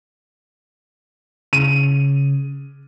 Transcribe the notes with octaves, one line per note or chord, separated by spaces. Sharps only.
C#3 D#7